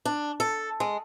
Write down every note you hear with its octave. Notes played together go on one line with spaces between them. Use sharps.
D4
A4
G#3